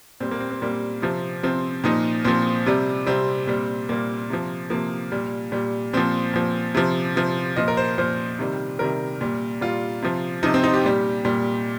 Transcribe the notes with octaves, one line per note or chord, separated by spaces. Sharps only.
A#2 G3 C4
A#3
C4
C4
A#2 G3 A#3
C3 F3 C4
C3 F3 C4
A#2 F3 D#4
A#2 F3 C4
C3 G3
C3 G3 C4
A#2 G3
A#2 G3 A#3
C3 F3
C3 F3 A#3
A#2 G3
A#2 G3
A#2 F3 C4
A#2 F3
C3 F3
C3 F3
A#2 F3 D#5
A#4
C5
A#2 F3 C5
C3 D#3 G3
C3 D#3 G3 A#4
A#2 G3
A#2 G3 F4
C3 F3
C3 F3 D#4
C4
D#4
G4
A#2 G3
A#2 G3